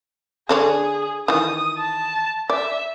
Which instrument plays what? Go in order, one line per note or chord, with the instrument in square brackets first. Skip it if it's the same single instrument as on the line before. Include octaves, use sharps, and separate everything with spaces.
[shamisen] D3 D4 C#5 [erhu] G#4
[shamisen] D#3 E3 [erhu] D#6
[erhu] A5
[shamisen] D5 [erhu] E5